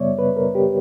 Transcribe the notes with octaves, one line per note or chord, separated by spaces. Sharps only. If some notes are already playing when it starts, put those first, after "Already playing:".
Already playing: F#2 C#3 G3 B3 C#5 D5 E5
B4
A#4
G4